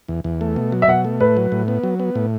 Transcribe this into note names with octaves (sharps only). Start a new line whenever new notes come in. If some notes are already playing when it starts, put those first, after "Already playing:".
E2
E2
A3
B2
F#3
E5
B2 F#5
A3
A2 B4
F#3
A2
B3
F#3
B3
A2